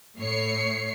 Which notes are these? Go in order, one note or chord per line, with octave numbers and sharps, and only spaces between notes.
A2 C#5 C7 C#7